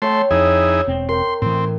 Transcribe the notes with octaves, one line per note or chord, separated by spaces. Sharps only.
A3 C#5 G5 C6
F2 D#4 E4 G#4
E1 C4
A#4 G5 C6
A2 E3 C4